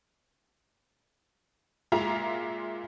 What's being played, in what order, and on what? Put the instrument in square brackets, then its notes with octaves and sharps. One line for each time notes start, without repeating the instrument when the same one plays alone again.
[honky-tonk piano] A#2 G#3 F4 E5 A#5 F7